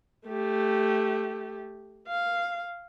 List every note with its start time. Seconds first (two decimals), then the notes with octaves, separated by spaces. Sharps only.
0.27 A3 G4
2.07 F5